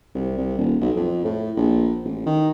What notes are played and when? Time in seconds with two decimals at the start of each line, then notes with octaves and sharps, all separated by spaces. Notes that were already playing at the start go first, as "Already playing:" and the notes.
0.15 C2
0.38 C2
0.58 D#1
0.81 B1
0.96 F2
1.25 A2
1.57 A#1
2.04 A1
2.26 D#3